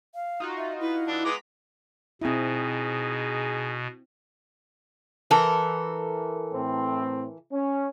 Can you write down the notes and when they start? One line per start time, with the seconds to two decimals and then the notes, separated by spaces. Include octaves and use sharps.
0.15 F5
0.40 D#4 F4 F#4
0.57 E5
0.80 E4 B4
1.07 E3 D4
1.25 G#3 B3 A#5 D6 B6
2.22 B2 C4 D#4 E4 G#4
5.31 E3 A4 A#4
6.53 A2 C4
7.52 C#4